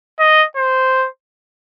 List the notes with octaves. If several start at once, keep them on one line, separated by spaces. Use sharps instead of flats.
D#5
C5